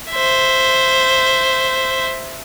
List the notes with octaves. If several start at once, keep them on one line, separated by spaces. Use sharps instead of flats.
C5 E5